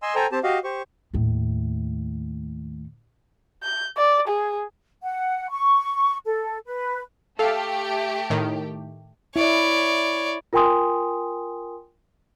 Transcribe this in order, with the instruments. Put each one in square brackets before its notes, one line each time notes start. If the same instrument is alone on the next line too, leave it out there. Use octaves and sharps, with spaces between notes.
[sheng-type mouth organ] D#5 G#5 C6 E6
A4 C5 G5 G#5 A#5
C4 G4 C5 A5
F#4 G4 D#5 F5
G4 C5 C#6
[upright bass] D#2 A2
[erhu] G6
D5
G#4
[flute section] F#5
C#6
A4
B4
[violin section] A3 G4 [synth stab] A4 F5
[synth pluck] A2 D#3
[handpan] E4 [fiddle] C#5 D5
[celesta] F4 A#4 G5 G#5 C6 D#6